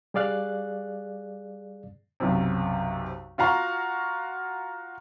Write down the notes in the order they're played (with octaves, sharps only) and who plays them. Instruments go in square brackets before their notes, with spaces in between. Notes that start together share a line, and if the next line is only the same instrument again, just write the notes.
[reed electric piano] G3 G#4 D5 F5 F#6
[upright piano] B1 F#2 C3
F4 F#4 F5 A#5 C#6